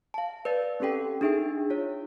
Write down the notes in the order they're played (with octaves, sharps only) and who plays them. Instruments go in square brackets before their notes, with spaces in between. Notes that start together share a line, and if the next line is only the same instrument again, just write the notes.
[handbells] F5 A5
B4 D5 E6 A6
C4 C#4 G4 A4 G5
D4 D#4 G#4 E5 G5 E6
F4 C#5